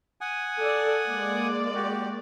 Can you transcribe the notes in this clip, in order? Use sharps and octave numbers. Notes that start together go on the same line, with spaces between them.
F#5 G#5 D#6
A4 D5
G#3 A#3 D5
F#4 G4